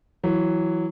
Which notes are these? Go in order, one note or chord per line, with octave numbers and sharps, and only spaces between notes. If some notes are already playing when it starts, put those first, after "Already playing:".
E3 F#3